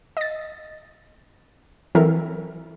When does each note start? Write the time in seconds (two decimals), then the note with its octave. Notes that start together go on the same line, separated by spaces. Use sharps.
0.17 D#5 A6
1.95 E3 F#3 C4 A4 A#4 E5